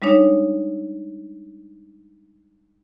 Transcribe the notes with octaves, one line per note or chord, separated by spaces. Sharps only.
G3 G#3 D4 D#4 C#5